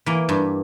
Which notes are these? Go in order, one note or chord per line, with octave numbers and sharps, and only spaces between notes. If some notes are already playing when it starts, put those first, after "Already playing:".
E3 A#3
G2